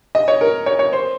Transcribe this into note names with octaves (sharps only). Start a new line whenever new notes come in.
D#5
C#5
A#4
C#5
C#5
C5